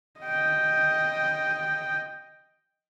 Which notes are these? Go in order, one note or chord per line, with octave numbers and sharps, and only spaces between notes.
D#5 G5